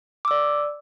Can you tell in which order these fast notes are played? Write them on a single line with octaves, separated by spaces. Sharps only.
D6 E6 D5